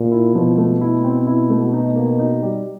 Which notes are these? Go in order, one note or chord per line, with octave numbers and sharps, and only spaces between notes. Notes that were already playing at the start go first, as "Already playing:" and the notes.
Already playing: A#2
E4
B2 F3
A3
E4
C4
E4
A3
D#4
A#3
D#4
G3